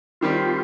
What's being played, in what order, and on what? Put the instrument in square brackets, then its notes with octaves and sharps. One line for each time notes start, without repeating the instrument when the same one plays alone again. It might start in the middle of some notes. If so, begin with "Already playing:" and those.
[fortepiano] D#3 G3 C4 G4 [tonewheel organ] F4